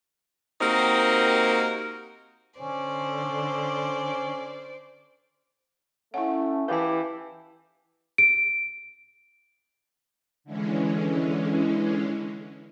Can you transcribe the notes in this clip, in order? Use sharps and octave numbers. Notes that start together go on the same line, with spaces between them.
A#3 C4 D#4 F#4 G4 A#4
D3 C#4 C5 D5
A3 C#4 E4 F#5
E3 G4 B4 F5 A5
D7
D3 E3 G#3 C#4